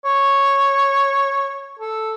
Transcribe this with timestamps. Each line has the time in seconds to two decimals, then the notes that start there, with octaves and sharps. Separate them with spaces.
0.05 C#5
1.79 A4